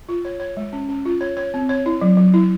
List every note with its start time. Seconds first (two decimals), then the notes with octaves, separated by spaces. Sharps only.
0.09 F4
0.25 C#5
0.40 C#5
0.57 G#3
0.73 C#4
0.88 C#4
1.05 F4
1.21 C#5
1.37 C#5
1.54 C4
1.69 C#5
1.86 E4
2.01 F#3
2.17 F#3
2.34 E4